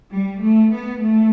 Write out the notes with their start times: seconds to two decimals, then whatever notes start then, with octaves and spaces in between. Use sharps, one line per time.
0.11 G3
0.41 A3
0.71 B3
0.99 A3